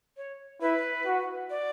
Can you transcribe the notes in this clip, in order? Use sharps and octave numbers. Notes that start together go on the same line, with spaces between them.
C#5
E4 B4
F#4
D5